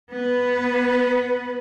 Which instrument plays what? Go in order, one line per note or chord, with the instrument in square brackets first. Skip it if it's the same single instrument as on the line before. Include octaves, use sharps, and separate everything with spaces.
[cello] B3 B4